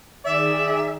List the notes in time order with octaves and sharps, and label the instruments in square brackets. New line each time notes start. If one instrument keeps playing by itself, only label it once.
[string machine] D#3 G#4 [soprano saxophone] D5 [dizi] E5